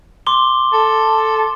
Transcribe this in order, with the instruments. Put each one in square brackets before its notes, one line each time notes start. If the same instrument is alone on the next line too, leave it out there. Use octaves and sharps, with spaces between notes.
[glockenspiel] C6 D6 G7
[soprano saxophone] A4